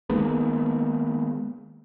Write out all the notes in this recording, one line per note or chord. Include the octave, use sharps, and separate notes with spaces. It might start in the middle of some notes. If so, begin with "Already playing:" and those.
D#3 G#3 A#3 B3